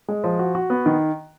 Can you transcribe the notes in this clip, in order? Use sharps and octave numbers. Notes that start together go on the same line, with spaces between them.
G#3
F3
F#4
F#4
B3
D#3